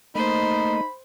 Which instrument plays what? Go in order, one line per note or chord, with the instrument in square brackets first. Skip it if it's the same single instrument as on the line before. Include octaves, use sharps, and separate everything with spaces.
[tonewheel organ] A3 A#3 D#5 [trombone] D#4 [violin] C5 [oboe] B5